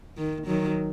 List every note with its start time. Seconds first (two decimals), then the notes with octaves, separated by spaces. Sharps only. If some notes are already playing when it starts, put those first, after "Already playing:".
0.17 D#3
0.47 D#3 F#3